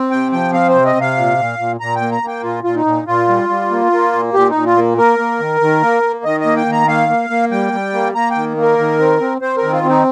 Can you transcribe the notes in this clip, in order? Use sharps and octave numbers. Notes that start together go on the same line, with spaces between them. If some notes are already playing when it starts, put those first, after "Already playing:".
Already playing: C4
C3 G5
F3 G5
C4 F5
C5
C3
D#5
C3
F5
A#2
A#2
A#2
A#2 A#5
G5
A#3
A#5
A#3 G5
A#2 F4
A#2 F4
D#4
A#2
A#2 F4
G3
G3
A#3
A#3
A#2
A#2 G4
A#2 D#4
F4
A#3
A#3 A#4
A#3
D#3
D#3
A#3
A#3
D#3 D#5
D#5
A#3
G5
D#3
A#5
A#3 F5
A#3
A#3
G3 G5
G3
A#3
A#3 A#5
D#3 G5
A#3
A#4
D#3
C4
C4
C4 C5
A#4
D#3
F4
C4
D#4